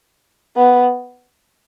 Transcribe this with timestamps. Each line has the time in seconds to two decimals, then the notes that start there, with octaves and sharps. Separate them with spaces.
0.56 B3